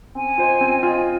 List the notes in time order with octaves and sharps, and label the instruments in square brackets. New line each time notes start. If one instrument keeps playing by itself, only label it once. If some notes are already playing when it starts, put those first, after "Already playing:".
[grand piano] C4 [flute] G#5
[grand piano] F4 C5 D#5
C4
F4 C5 D#5